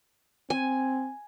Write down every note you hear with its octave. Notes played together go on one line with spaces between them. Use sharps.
C4 G#5